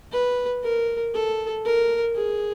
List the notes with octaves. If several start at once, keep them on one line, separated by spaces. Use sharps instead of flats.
B4
A#4
A4
A#4
G#4